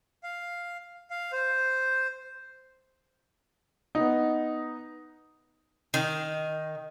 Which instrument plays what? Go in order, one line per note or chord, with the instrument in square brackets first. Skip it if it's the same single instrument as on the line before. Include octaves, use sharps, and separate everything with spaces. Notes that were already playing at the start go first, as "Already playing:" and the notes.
[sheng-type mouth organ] F5
F5
C5
[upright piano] B3 D#4
[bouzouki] D#3